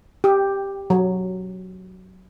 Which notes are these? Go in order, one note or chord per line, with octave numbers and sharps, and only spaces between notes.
G4
F#3